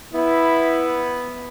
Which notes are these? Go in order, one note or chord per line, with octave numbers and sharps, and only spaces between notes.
B3 E4